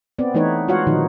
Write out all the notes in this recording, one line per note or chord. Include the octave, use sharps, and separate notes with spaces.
B3 C4 D5
E3 A3 B3 D#4 B4 C#5
G#3 F4 F#4 C#5 F5 F#5
A#2 D3 D#3 F3 D#4